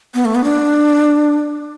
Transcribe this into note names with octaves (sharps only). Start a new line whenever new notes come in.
B3
A3
B3
D4